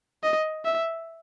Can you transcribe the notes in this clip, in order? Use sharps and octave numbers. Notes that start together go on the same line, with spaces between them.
D#5
E5